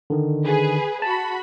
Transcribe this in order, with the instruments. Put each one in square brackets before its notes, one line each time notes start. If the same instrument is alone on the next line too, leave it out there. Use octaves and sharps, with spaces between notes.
[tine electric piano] D3 D#3
[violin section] G#4 B4
[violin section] F#4 B5 [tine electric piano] A5